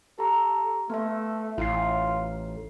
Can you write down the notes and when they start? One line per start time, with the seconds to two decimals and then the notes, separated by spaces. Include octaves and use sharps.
0.19 G4 A4 A#5
0.90 A3 B3 E5
1.58 A1 E4 F4 C7